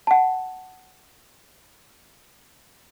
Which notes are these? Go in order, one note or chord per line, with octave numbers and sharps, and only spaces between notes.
F#5 A5